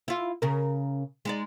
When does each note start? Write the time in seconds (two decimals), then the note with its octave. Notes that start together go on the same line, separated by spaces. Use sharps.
0.08 E4 F4
0.42 C#3 A#4
1.25 G#3 D#4 D5